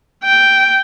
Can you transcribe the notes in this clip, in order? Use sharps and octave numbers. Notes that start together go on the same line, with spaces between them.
G5